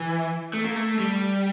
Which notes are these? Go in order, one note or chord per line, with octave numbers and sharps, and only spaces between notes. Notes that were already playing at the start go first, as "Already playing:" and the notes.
Already playing: E3
A3
A#3
A3
G3